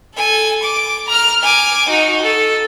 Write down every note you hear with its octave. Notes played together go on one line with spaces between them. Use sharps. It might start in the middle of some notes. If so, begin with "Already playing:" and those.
A4 G#5
D6
A#5 F6
G#5 D6
D#4 F#4
A4